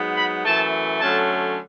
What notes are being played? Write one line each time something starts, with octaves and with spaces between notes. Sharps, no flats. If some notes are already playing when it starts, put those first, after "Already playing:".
Already playing: G#2 F#3 B3
B5
F#2 E3 A3 A5
D3 F#3 A3 C#4 A5